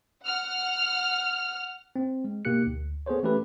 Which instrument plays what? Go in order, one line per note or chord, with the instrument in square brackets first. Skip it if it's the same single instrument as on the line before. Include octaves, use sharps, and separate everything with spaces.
[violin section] F#5 F6
[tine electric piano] C4
G#3
B2 A#3 D#4 G4 F#6 C#7
D2
B3 G#4 A4 C5 C#5
E3 A3 C#4 G4 A4 B4